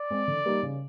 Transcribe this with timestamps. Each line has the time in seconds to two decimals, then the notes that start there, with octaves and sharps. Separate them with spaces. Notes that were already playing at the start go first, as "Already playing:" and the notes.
Already playing: D5
0.10 G#3 C4
0.28 D3
0.45 G3 A#3 D#4 G4
0.63 C#3